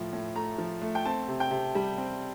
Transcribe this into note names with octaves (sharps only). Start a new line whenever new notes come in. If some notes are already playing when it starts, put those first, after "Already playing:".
Already playing: A2 F3
A2
A3 A#5
F3
A3
G5
C4 A5
C3
G5
C3
G3
C4